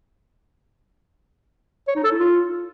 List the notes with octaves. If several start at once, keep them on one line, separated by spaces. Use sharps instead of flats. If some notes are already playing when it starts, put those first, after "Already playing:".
C#5
D#4
A4
E4
F4